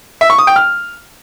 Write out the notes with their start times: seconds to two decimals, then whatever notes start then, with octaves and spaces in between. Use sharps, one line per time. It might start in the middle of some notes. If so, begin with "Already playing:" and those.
0.21 E5
0.30 C#6
0.38 D#6
0.47 G5
0.56 F6